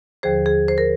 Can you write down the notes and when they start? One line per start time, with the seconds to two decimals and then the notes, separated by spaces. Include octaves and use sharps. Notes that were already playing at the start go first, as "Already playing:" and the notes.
0.23 D#2 D3 F3 G#4 C5
0.46 G#4
0.68 C5
0.78 A#4